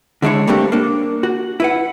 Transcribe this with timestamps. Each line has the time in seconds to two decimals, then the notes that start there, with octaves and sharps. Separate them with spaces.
0.22 D3 G#3 D4 E4 C#5
0.47 G3 A3 A#3 C4 D4 G4
0.72 A#3 D4
1.23 F#4
1.60 E4 B4 F#5